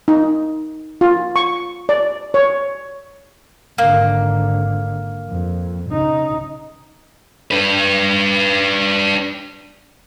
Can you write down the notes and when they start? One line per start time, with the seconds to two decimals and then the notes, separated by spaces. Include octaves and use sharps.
0.08 D#4
1.01 F4
1.36 C#6
1.89 D5
2.34 C#5
3.78 G#1 D3 A#3
5.29 F2
5.90 C#3 D#4
7.51 D4 B4